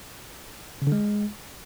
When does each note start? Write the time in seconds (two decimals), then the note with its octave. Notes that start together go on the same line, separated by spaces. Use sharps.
0.82 C#3
0.87 D3
0.92 G#3